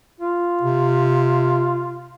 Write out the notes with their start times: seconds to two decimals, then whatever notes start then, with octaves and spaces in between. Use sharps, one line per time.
0.20 F4
0.61 C3